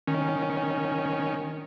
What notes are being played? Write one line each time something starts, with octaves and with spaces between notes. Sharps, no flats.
D#3 C#4